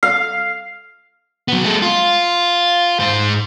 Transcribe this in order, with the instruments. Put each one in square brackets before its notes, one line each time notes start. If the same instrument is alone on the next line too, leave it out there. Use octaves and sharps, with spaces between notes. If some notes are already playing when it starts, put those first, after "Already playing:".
[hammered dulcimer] F5
[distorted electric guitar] F#3 B3
G#3 A4
F4
G#2 C5